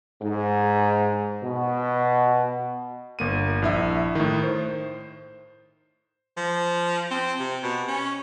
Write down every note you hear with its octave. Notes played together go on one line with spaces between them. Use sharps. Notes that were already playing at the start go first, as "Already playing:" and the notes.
G#2
B2
G1 A#3 D#7
A#1 E4 E5
A2 D#3
C5
F3
C4
C3
B2
C#4